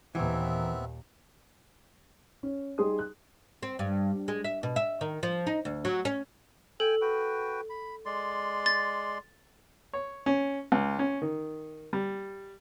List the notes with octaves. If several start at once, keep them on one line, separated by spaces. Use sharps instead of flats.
D#2 A#2 E3 B3 C4 E5
C#4
G3 D#4 G#4 C6 D#6
F#6
C4
G2
G#3
E5
B2
E5
D#3
F3
D#4
D2
F#3
C#4
A4 G5 G#5
F#4 B4 G5
B5
G#3 D5 C6
A6
C#5
C#4
C#2
C#4
D#3
G3